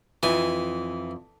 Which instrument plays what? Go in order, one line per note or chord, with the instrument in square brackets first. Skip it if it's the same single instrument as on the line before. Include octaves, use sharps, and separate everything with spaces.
[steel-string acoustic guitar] F2 [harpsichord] E3 G#5